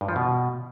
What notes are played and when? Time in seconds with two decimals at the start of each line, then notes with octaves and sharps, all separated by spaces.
0.01 G2
0.08 F3
0.16 B2